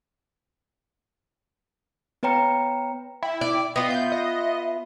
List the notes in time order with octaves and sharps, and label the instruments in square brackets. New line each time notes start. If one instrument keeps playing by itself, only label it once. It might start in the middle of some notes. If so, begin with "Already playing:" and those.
[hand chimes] B3 B4 C#5 G5 A#5 C#7
[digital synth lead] E4 [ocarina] G5
[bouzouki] D5
[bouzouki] B3 F4 [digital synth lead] D#5 [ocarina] G5
[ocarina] E5 [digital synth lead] G6
[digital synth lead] D#5